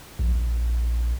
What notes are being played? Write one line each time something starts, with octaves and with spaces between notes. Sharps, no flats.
A#1